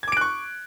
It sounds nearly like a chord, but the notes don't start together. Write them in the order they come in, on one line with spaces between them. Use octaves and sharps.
G#6 D6 D7 F#6 C#6